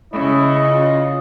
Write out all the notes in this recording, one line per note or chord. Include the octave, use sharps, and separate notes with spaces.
C#3 C#4 E4 D#5
F4